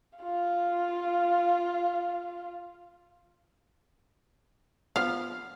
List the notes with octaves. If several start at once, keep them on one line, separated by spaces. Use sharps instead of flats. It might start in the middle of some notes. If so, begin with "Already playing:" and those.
F4 F5
F3 B3 F5